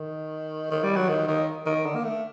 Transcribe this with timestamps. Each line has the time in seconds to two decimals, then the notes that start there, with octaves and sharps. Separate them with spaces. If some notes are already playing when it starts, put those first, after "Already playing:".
Already playing: D#3
0.71 D#3
0.84 G3
0.96 F#3
1.09 D#3
1.28 D#3
1.66 D#3
1.86 D3
1.95 A#3
2.04 A3